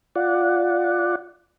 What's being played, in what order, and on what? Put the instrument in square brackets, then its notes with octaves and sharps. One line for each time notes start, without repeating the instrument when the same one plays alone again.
[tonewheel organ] F4 D5 F#5